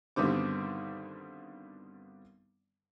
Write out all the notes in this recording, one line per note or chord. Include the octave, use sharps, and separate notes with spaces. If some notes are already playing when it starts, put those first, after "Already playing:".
G2 B2 D3 D#3 C4 D6